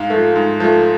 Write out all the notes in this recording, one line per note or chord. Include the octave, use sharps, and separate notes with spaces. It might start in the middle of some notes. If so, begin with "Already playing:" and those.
Already playing: G#2 F5
F3 A3
G#2
F3 A3